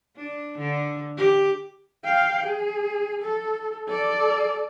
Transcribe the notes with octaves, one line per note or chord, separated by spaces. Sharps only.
D4
D3
G4
F5 G5
G#4
A4
A4 D5